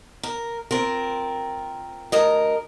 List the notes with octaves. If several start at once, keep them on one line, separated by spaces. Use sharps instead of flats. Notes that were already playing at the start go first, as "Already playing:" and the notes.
A#4
C4 F4 A#4
D2 A#4 D#5